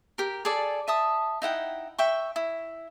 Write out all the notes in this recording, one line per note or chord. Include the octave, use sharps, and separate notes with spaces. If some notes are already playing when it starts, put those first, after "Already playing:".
G4 A#4
G#4 A4 D5
E5 A5 D#6
D#4 E4 F#5 G5
E5 G5 C#6
E4